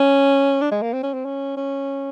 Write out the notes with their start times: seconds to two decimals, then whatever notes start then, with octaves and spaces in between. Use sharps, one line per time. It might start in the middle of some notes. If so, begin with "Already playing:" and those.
Already playing: C#4
0.61 D4
0.71 G#3
0.82 A#3
0.93 C4
1.03 C#4
1.14 C4
1.25 C#4
1.57 C#4